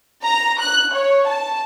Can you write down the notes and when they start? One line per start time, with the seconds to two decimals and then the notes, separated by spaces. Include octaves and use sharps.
0.24 A#5
0.61 F#6
0.95 C#5
1.28 A5